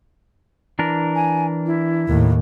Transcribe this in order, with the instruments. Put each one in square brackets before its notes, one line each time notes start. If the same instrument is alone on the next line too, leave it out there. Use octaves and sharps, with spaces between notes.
[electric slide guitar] E3 D4 A#4
[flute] G#5
E4
[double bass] D#2 A2